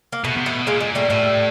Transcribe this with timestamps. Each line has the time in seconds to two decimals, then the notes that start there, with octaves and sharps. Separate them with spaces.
0.12 A#3
0.24 B2 A3 B3
0.36 C3
0.46 B2 A3 B3
0.66 A#2 G#3 A#3
0.80 G#3
0.95 G3 A3
1.09 A2 G3 A3